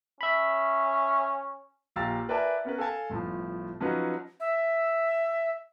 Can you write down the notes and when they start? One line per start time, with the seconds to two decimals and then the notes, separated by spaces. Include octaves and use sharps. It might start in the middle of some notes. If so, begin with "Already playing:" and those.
0.21 C#4 E5 B5
1.96 A#1 G4 F5 A#5 E6 A6
2.28 A#4 B4 D5 E5 G#5 A5
2.65 B3 C#4 A#4 B4
2.78 A4 F5 G#5 A5
3.10 G1 A2 F3
3.80 F3 F#3 C#4 D#4 B4
4.40 E5